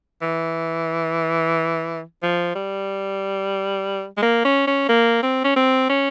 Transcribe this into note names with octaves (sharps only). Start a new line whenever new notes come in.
E3
F3
G3
G#3
A#3
C#4
C#4
A#3
C4
C#4
C4
C#4